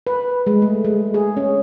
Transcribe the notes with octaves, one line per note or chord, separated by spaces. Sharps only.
B4
G#3
A3
G#3
G#4
C#4